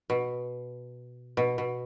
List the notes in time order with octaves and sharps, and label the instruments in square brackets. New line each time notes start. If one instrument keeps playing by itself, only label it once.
[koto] B2
B2
B2